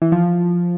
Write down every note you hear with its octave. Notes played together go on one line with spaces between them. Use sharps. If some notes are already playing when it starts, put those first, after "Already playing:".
E3
F3